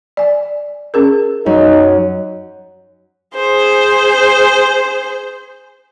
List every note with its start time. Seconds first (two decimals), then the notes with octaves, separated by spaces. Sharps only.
0.17 D5 G#5
0.94 C#4 G#4 A#4
1.46 F#2 D#4
3.35 G#4 C5